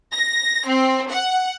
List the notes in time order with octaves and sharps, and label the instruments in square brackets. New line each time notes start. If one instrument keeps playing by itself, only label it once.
[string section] A#6
C4
F#5